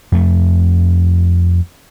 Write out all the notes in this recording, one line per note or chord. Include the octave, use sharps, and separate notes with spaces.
F2 A3